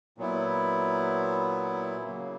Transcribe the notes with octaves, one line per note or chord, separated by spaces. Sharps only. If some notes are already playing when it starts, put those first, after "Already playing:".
A#2 F#3 B3 E4
C#3 F#3 A#3